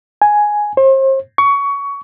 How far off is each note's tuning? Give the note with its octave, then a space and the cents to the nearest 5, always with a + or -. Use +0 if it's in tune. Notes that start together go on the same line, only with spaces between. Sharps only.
G#5 +5
C5 +40
C#6 +20